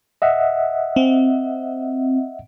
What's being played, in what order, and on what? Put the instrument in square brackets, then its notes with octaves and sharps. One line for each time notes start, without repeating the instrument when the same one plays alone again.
[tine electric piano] D#5 E5 F#5
[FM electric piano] C4